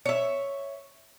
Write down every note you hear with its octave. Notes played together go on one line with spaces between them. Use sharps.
C#5 E5